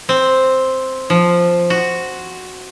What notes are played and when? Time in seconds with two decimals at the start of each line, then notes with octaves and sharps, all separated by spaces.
0.09 C4
1.10 F3
1.70 F#4